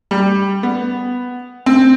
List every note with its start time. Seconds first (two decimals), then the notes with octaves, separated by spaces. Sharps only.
0.11 G3
0.63 B3
1.66 C4